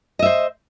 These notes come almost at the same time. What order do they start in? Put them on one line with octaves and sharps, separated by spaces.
D#5 E5 C5